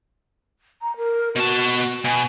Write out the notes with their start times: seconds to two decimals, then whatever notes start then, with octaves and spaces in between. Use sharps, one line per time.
0.82 A#5
0.97 A#4
1.35 B2 F#4 A5
2.04 B2 G#5